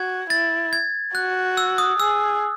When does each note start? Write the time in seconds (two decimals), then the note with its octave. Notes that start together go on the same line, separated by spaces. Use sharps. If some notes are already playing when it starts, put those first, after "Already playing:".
Already playing: F#4 G#6
0.30 E4 A6
0.73 G#6
1.15 F#4 F#6
1.57 E6
1.78 D#6
2.00 G#4 E6